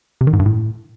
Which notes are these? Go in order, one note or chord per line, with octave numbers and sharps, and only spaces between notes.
C3
D#3
G#2
G2
A2